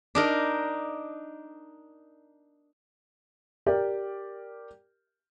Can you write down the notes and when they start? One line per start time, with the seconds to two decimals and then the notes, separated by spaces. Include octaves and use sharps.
0.15 D4 D#4 A#4
3.66 G4 A#4 D5 G5